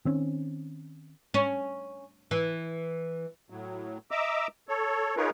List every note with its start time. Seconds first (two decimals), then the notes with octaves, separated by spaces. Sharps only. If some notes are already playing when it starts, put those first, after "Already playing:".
0.05 D#3 C4 C#4
1.34 C#4
2.31 E3
3.50 A2 F#3
4.11 D#5 E5 A#5 D6 E6
4.68 A4 C#5
5.17 D#4 F4 G#4 A#4 B4 C#5